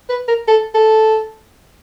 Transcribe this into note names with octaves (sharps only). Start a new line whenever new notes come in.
B4
A#4
A4
A4